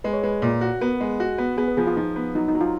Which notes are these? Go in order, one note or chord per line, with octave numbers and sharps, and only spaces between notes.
G#3 B4
C#5
G#3 B4
A#2
F#4
B3 A#4
G#3
F#4
B3
B3 G#4
B4
F3 G#4
F4
F3 D#4
B3
F#3 D#4
D#4
F#3
F4